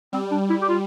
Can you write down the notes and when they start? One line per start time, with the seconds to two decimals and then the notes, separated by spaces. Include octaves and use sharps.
0.13 G3 C4
0.31 D4
0.50 E4
0.62 G4
0.69 F4